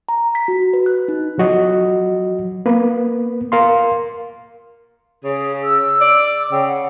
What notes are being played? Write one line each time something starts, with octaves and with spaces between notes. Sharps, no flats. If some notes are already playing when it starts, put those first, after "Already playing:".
A#5
B6
F#4
B4
F#6
D#4
F3 F#3 F#4 D#5
A#3 B3 B4
A#4 F5 C6
C#3 G#4
E6
D5
C#3 G5
F#5